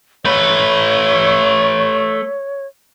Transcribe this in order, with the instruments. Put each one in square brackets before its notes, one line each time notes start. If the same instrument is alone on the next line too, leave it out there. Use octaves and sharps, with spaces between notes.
[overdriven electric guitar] A3 B4 [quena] C#5